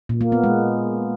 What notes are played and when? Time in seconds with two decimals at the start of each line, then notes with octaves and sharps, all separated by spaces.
0.09 A#2
0.21 A#3
0.32 B3
0.44 G#3